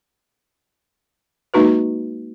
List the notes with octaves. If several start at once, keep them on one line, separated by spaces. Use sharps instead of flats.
G#3 A#3 D#4 F#4 B4